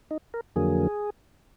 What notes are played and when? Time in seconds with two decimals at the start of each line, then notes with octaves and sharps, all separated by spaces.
0.11 D#4
0.34 A#4
0.56 F2 D3 F#3 A#3 G#4